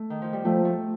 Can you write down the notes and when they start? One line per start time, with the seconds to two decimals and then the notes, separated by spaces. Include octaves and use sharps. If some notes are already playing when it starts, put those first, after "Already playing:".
Already playing: A3
0.10 D#3
0.22 F3
0.33 G3
0.45 F3 A3
0.65 A3